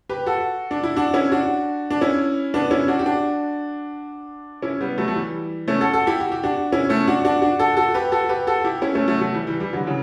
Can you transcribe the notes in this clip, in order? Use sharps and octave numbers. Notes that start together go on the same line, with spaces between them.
G4 B4
F#4 A4
D4
E4
D4 F#4
C#4 E4
D4 F#4
D4
C#4 E4
B3 D4
C#4 E4
D4 F#4
G4
D4 F#4
C#4 E4
G3 B3
F#3 A3
A3
E3 G3
A3 C#4
F#4 A4
F#4 A4
E4 G4
F#4
G4
D4 F#4
C#4 E4
A3 C#4
D4 F#4
D4 F#4
D4 F#4
F#4 A4
F#4 A4
G4 B4
F#4 A4
G4 B4
F#4 A4
E4 G4
C#4 E4
A3 C#4
F#3 A3
F#3 A3
E3 G3
E3 G3
E3 G3
D3 F#3
C#3 E3